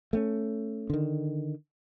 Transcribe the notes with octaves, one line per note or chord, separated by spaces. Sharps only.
A3 B3 C#4
D3 D#3